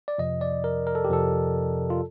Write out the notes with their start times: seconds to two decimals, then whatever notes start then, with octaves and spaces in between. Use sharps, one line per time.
0.08 D5
0.18 F2 C3 F3 D#5
0.41 D5
0.64 A#4
0.87 A#4
0.95 A4
1.05 G4
1.09 F2 C3 F3 A4
1.90 F4